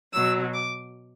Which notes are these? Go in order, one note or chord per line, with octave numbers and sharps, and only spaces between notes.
B2 F#3 E6
D6